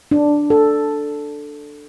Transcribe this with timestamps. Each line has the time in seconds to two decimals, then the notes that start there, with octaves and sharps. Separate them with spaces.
0.11 D4
0.50 A4